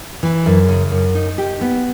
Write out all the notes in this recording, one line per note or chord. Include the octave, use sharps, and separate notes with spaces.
E3
F#2
C#3
F#2
D#4
G4
B3